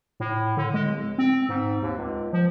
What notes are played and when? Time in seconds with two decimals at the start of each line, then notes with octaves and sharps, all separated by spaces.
0.20 A2
0.57 D3
0.74 G#3
0.86 D1
1.18 C4
1.49 G#2
1.82 D#2
1.97 C#2
2.33 F3